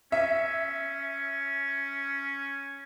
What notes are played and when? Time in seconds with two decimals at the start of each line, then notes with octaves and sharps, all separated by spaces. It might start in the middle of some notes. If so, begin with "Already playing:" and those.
0.12 C#4 E5